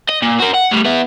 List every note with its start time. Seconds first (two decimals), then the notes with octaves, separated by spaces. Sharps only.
0.09 D#5
0.22 A#2
0.40 F#4 A#4
0.54 F#5
0.72 G3 A3
0.85 B3 E4